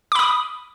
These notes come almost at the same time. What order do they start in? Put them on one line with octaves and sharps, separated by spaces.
D6 B5 D#6